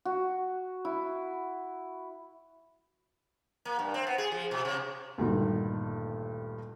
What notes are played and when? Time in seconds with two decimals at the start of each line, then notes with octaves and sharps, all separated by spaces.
0.05 F#4
0.85 E4
3.65 A#3
3.79 G2
3.94 C4
4.07 B3
4.18 G#4
4.32 F3
4.51 B2
4.65 C3
5.18 D2 G2 A#2 D#3